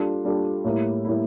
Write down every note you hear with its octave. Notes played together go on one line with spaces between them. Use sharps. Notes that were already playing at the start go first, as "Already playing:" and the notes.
Already playing: G3 D4 F4 A4
G3 D4 F4 A4
A2 G3 A#3 E4
A2 G3 A#3 E4